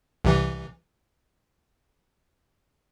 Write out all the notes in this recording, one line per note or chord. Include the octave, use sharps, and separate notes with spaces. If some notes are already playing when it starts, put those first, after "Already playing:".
C2 C3 E3